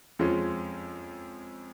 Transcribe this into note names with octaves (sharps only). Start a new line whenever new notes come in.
F2 F3 G#3 C#4